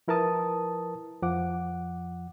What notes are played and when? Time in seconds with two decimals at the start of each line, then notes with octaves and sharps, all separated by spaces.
0.08 F3 E4 A#4 B4 A5 D#6
1.22 F2 F3 F#5 D6